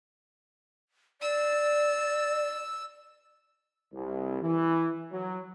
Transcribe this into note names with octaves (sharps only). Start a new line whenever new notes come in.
D5 E6
C2
E3
F#3